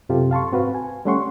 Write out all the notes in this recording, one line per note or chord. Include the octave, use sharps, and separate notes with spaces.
F#2 C3 F4 G4 A4
F5 A5 C6 C#6
G#2 C4 F#4 B4 F5
G#5
G3 A3 C#4 F#5 C6 C#6